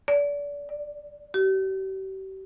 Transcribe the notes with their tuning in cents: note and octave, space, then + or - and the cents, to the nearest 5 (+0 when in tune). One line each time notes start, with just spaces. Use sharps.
D5 -30
D5 +5
G4 -40